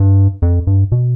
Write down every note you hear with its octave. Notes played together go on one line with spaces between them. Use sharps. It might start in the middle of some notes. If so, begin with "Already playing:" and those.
Already playing: G2
F2
G2
B2